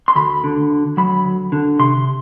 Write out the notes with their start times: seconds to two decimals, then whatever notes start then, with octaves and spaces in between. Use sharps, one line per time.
0.08 C6
0.16 D2 B5
0.44 D3
0.71 D2
0.97 F#3 B5
1.24 D2
1.52 D3
1.79 C3 C6